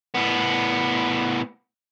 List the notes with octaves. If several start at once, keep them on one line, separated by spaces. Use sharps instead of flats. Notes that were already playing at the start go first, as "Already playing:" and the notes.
A2 B3